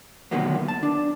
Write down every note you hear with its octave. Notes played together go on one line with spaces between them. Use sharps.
D2 B2 D#3 F#3 A#3 B3
A5
D4